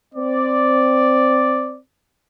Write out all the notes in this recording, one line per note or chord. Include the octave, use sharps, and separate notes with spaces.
C4 D5